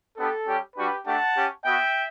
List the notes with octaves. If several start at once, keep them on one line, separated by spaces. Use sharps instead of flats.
B3 D4 G4 A4
G3 C#4 G4
G3 D4 F#4 G4 B4
A3 D4 G4 F#5 A5
C#4 G4
B3 F#4 E5 G5